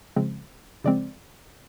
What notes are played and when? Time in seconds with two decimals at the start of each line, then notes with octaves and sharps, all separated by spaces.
0.16 C#3 F3 G#3 C4
0.84 C#3 F3 G#3 C4 D5